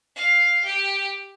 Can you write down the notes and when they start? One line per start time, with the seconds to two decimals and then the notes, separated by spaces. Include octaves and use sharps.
0.16 F5
0.64 G4